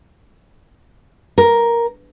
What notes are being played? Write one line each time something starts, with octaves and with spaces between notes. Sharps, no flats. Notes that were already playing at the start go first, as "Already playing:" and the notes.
A#4